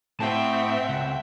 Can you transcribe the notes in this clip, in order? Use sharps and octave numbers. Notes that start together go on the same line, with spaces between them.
A2 C4 E5 F#5 G5 A5
C#2